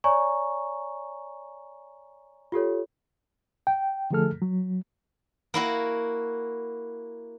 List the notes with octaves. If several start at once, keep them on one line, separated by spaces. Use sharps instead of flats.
C#5 D5 G#5 A#5 C#6
F4 G4 A4 C#5
G5
D3 F3 A3 G#4 A4 F6
F#3
A#3 E4 F#4